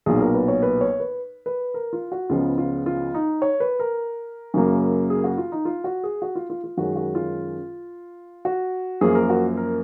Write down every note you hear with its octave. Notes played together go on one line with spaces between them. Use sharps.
B1 A#2 F#3 B3 G#4
A#4
B4
C#5
B4
C#5
B4
B4
A#4
F4
F#4
C#2 C#3 F3 B3 F4
F4
F4
D#4
C#5
B4
A#4
F#2 C#3 F#3 A#3
G#4
F#4
F4
D#4
F4
F#4
G#4
F#4
F4
F4
F4
F#2 D#3 G#3 C#4 F#4
F#4
F4
F#4
F#2 F3 A#3 G#4
A#4
F#4
A#4